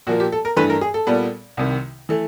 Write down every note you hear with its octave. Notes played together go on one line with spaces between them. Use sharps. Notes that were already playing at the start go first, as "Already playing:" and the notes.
A#2 F3 A#3 F#4
G4
A4
A#4
G2 E3 A3 B4
A#4
G#4
A4
A#2 G3 B3
C2 C3 D#3
E3 A3